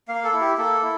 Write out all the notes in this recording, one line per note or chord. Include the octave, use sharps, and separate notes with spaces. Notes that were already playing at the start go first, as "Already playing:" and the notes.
A#3 F5
A4
E4
G4
A#3 A4
E4